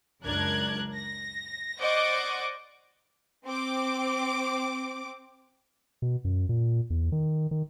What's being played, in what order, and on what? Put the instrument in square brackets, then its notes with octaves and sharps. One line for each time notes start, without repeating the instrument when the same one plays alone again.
[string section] C#2 F#2 D4 A#4 F#6 G#6
A#6
C5 D5 D#5 F#5 C#6 D6
[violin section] C4 D6
[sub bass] B2
F#2
A#2
E2
D#3
D#3